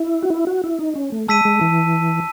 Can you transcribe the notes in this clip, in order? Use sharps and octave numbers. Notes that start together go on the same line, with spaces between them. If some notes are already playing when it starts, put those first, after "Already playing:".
Already playing: E4
F#4
E4
F#4
E4
D#4
C#4
A3
G#3 A5 E6 B6 D#7
G#3
E3